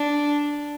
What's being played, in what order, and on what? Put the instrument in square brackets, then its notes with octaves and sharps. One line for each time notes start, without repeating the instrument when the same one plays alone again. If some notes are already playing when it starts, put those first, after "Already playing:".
Already playing: [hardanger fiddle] D4